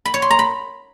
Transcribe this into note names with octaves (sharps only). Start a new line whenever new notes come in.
B5
C#5
C6
A#5
B5